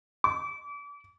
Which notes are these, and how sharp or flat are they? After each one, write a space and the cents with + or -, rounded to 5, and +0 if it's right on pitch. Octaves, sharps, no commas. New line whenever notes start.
D6 -35